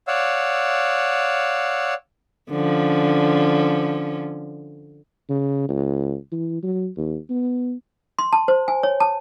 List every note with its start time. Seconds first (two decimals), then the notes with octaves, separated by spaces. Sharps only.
0.08 C#5 D5 F5 F#5 E6
2.51 D3 F3 C#4
5.29 C#3
5.69 C#2
6.32 E3
6.63 F#3
6.97 D#2
7.30 B3
8.19 C6
8.33 A5
8.48 C5
8.68 G#5
8.83 C#5
9.00 A5